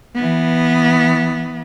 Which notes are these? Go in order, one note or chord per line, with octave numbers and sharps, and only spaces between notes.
E3 B3